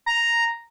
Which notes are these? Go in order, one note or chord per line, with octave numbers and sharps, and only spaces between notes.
A#5